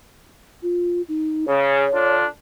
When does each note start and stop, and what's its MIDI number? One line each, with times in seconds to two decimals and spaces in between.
0.62 1.02 65
1.08 1.46 63
1.48 1.84 49
1.48 2.16 73
1.92 2.24 50
1.92 2.24 62
1.92 2.24 65